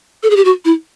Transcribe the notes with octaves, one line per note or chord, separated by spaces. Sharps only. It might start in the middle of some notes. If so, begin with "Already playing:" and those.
A4
G#4
G4
F#4
E4